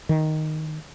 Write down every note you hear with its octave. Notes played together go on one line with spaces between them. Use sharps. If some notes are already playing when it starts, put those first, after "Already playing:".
D#3